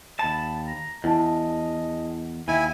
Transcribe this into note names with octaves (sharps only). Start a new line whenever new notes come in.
D#2 A5 B5
A#5
E2 E4 D#5 A5
D#2 E4 G#5